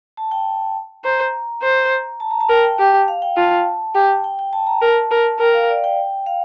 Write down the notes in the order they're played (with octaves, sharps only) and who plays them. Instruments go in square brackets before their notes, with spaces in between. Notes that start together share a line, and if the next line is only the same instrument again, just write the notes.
[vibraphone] A5
G5
[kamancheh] C5 [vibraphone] A#5
[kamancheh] C5
[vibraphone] A5
A#5
A5
[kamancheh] A#4 [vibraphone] G5
[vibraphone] G5
[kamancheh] G4
[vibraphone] F5
G5
[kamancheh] F4 [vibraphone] A5
[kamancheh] G4 [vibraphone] G5
[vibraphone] G5
G5
A5
A#5
[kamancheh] A#4 [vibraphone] A5
[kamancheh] A#4
[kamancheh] A#4 [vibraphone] G5
[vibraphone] F5
D5
G5
F5